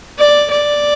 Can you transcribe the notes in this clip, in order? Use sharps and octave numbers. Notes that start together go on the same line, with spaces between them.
D5
D5